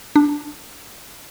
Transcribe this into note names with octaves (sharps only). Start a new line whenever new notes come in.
D4